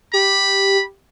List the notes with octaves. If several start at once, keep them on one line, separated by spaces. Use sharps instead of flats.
G4 B5